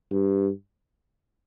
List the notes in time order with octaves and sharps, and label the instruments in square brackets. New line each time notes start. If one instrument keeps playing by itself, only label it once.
[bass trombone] G2